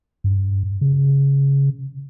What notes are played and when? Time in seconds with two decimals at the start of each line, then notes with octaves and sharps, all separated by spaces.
0.24 G2
0.81 C#3